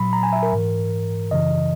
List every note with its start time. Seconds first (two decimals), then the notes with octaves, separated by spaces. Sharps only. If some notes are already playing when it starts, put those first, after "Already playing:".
Already playing: A#2 F#3 B5
0.13 A#5
0.23 G#5
0.33 E5
0.43 A#4
0.53 G#2 E3
1.31 F#2 C#3 E3 D#5